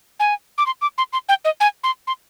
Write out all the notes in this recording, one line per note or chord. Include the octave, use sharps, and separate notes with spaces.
G#5
D6
C6
D6
C6
C6
G5
D#5
G#5
C6
C6